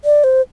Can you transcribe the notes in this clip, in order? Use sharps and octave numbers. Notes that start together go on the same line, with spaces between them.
D5
C5